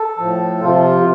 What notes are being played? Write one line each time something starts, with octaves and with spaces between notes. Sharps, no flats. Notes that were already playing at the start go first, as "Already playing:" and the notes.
Already playing: A4
A2 F3
C3 F3 F4